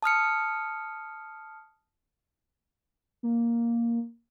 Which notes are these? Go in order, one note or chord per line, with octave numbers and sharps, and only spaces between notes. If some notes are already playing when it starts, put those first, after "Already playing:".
A5 D#6 F6 C#7
A#3